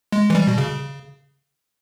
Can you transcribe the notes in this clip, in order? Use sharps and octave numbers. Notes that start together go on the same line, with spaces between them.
G#3
E3
G3
B2
C#3